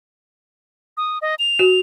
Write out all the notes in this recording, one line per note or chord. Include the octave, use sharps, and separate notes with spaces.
D#6
D#5
F7
F#4